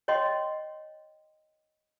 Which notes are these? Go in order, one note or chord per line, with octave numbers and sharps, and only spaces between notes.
C#5 D#5 G5 C6